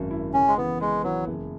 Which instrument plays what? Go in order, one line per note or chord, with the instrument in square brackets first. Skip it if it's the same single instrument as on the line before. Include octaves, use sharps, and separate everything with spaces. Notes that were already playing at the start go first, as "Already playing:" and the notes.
Already playing: [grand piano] G#1 F#2 F#3
E4
[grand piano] C#3 [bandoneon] C#4
[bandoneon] G#3
[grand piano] E3 [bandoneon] B3
[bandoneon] G#3 [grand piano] B3
[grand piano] E3 [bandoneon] F#3
[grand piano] F#1